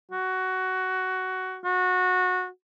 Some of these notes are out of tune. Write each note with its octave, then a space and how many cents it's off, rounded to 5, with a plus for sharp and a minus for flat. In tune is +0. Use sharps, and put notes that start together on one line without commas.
F#4 +15
F#4 -20